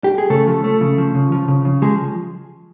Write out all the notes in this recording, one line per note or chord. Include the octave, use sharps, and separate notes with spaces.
G4
G#4
C#3 A3 A4
F3
A3
C#3
F3
C#3
F3
C#3
C#3
F3 G#3 G#4